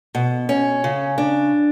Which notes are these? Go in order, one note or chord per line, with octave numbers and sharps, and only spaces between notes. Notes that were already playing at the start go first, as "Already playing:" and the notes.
B2
C#4
C#3
D4